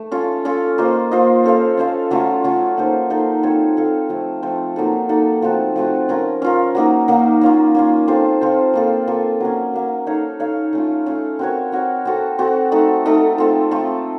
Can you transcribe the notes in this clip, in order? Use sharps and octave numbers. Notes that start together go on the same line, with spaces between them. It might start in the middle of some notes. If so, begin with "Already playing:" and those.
Already playing: A3
C#4 F4 A4
C#4 F4 A4
A#3 F4 C5 D#5
A#3 F4 C5 D#5
C#4 A4 C5 F5
C#4 A4 C5 F5
F#3 A3 C#4 F4
F#3 A3 C#4 F4
A#3 D#4 A4 C5
A#3 D#4 A4 C5
C4 F4 A4 C#5
C4 F4 A4 C#5
F3 A3 C4
F3 A3 C4
F#3 A#3 D#4 A4
F#3 A#3 D#4 A4
F3 A3 C4 F#4
F3 A3 C4 F#4
C#4 F4 A#4
C#4 F4 A#4
F#3 A#3 D#4 A#4
F#3 A#3 D#4 A#4
A#3 C#4 F4
A#3 C#4 F4
C4 F4 A4 C5
C4 F4 A4 C5
A#3 F4 A4
A#3 F4 A4
F#3 A#3 C#4
F#3 A#3 C#4
D#4 A4 C#5 F5
D#4 A4 C#5 F5
A3 C#4 F4
A3 C#4 F4
C4 F#4 A#4 C#5
C4 F#4 A#4 C#5
C4 F#4 A4
C4 F#4 A4
A3 D#4 A4
A3 D#4 A4
A3 C4 F4
A3 C4 F4